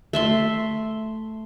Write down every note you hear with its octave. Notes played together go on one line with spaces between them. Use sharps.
A3 E5 C6